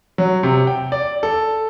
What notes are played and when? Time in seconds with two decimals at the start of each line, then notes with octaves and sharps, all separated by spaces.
0.18 F#3
0.43 C3
0.67 G5
0.92 D5
1.23 A4